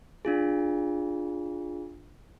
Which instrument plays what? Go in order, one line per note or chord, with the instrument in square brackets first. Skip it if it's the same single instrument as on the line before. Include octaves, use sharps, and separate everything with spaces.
[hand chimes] D4 F4 G#4